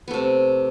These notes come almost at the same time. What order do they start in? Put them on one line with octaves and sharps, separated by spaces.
B3 A3 C3